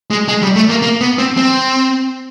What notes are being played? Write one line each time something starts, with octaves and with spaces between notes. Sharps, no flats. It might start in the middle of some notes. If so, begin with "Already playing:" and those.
G#3
G#3
G3
A3
A#3
A#3
B3
C4
C4